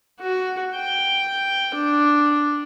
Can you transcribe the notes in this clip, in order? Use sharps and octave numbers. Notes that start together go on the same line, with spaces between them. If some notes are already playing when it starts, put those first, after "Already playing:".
F#4
G5
D4